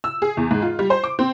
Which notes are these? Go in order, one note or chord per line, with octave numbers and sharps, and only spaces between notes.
E6
G#4
E2
G#2
F4
G3
C5
D6
C4